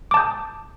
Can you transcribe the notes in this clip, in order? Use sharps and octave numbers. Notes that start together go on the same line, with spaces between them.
A5 D6 D#6 G6